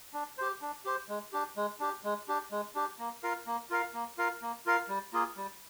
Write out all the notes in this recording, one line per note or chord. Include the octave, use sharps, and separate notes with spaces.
D4
G4 C5
D4
G4 C5
G#3
D4 G4
G#3
D4 G4
G#3
D4 G4
G#3
D4 G4
A#3
F4 A#4 F5
A#3
F4 A#4 F5
A#3
F4 A#4 F5
A#3
F4 A#4 F5
G3
A#3 F4 G#4
G3